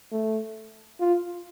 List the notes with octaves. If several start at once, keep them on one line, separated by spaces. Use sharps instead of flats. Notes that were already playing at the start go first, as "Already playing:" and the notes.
A3
F4